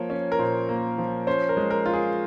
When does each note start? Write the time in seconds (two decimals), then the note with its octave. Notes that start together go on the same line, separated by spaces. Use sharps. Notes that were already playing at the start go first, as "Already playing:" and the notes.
Already playing: F3 A#3 C#5
0.10 C#4
0.32 A#4
0.39 A#2 C5
0.69 A#3
0.98 F3
1.27 C#4 C5
1.49 A#4
1.57 G#3
1.70 A#4
1.86 F4
1.93 G#4